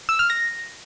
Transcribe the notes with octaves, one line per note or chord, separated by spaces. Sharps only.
E6
F6
A#6